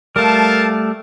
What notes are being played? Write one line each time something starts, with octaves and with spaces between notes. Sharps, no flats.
G3 A3 A#4 F5 A5